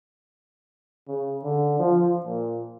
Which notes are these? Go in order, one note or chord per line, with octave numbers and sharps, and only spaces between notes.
C#3
D3
F3
A#2